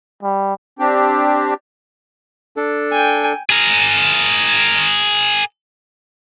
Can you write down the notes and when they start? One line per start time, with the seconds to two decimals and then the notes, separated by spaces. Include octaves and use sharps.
0.23 G3
0.79 C4 D4 G4
2.57 D4 A4
2.92 G5 G#5
3.50 G#4 A#4